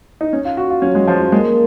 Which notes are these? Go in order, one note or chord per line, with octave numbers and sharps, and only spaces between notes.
D#4
C#4
F4
F#4
F4
F#3 C#4
G#3
F3
F#3
G#3 A#3